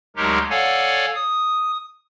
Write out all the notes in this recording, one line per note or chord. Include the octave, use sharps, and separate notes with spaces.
D2 F#3 G#3 D#4 G4 A#4
A4 C#5 D5 F5 F#5 G#5
D#6